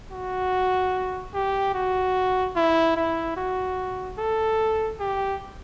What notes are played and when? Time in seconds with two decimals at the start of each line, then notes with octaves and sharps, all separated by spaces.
0.12 F#4
1.34 G4
1.74 F#4
2.56 E4
2.96 E4
3.37 F#4
4.18 A4
5.00 G4